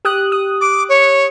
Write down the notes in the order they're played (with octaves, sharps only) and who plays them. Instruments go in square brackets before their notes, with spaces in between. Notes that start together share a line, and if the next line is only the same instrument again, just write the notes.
[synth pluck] G4 D#6 F#6
D#6
[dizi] D6
C#5